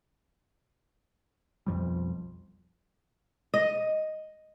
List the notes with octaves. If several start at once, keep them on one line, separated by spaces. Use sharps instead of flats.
B1 F2 F3 G3
D#5